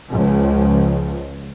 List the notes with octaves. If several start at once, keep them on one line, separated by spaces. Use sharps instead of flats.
C#2 F3